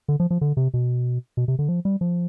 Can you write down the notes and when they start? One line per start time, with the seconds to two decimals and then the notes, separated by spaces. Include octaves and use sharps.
0.08 D3
0.20 F3
0.30 F3
0.41 D3
0.57 C3
0.74 B2
1.37 B2
1.48 C3
1.59 D3
1.69 F3
1.85 G3
2.01 F3